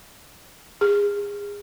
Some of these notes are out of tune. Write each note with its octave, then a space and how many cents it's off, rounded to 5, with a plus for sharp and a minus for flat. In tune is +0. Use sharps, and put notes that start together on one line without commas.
G#4 -30